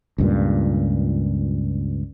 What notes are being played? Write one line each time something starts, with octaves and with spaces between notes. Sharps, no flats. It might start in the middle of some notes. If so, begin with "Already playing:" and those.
C#2 G2 A#2